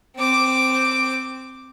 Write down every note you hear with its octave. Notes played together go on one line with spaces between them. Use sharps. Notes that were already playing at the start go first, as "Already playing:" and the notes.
C4 D6